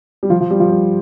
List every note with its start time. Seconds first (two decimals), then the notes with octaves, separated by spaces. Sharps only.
0.23 G3
0.30 F3
0.41 F3
0.51 G3
0.60 F3
0.70 G3